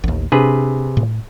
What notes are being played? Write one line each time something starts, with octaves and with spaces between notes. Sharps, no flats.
A1 D#2
C3 D4 G#4 B4
A2